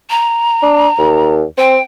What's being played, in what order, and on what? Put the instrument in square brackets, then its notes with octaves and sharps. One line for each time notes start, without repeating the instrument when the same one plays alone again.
[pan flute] A#5
[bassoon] D4
D#2
[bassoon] C4 [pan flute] G5